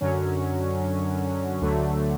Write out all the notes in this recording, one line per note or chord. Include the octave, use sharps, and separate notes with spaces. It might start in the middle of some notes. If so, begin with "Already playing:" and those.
F#2 D3 F#3 C#4
D2 D3 F#3 A3